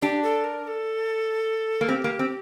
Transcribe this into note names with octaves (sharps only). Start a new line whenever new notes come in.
D4 G4
A4
A#4
A#4
A4
A#3
C4 G4
A#3
C4